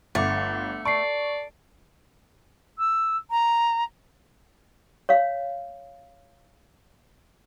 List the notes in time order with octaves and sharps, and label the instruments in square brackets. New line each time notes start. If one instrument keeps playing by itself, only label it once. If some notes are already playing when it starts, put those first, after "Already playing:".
[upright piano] G1 [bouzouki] A3 [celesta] F#5 D6
[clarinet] D5 [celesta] A5 C7 [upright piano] C#6
[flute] E6
A#5
[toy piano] C#5 F5